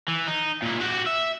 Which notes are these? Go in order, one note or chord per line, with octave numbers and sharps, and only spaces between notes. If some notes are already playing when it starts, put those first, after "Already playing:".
E3
D#4
A#2 E4
F#4 G4
E5